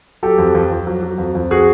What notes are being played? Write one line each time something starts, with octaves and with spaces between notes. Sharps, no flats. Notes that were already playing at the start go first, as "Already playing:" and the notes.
F#3 G4 A4
F2
F2
F2
F#3
F#3
F2
F2
F#4 G#4